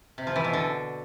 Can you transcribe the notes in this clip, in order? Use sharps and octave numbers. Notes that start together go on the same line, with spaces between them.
C3
F3
E3
B2
D3